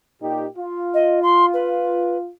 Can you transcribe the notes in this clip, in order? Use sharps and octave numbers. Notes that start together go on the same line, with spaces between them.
A#2 D#4 G4
F4
D#5
C6
B4